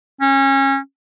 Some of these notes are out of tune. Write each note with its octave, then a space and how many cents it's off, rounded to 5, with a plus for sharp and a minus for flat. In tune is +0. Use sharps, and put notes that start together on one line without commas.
C#4 -25